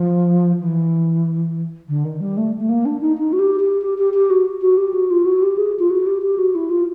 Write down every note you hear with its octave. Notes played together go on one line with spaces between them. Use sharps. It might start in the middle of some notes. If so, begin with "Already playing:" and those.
Already playing: F3
E3
D3
D#3
G3
A3
A3
A#3
D4
D#4
D#4
F#4
G4
G4
G4
G4
G4
F#4
F#4
G4
F#4
F4
F#4
G4
G#4
F4
F#4
G4
G4
F#4
E4
F4